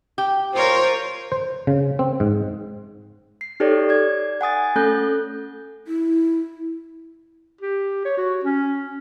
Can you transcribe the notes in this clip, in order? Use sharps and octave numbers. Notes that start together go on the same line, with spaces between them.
G4
F4 A#4 C5 C#5
C5
C#3
C4
G#2
C7
D#4 G4 A4 C#5 D5
D5 G#6
F#5 G#5 D#6 A6
A3 C#4 A4 F#6 G6
E4
G4
C#5
F#4
C#4